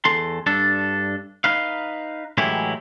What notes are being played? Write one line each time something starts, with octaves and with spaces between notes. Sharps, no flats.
E2 A4 C6
G2 D4 A4
D#4 B4 F5
A2 E3 F#3 G#3 E4 G4